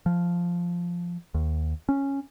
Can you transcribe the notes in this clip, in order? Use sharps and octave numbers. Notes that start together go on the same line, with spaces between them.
F3
D#2
C#4